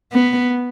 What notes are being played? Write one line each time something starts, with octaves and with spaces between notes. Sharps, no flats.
B3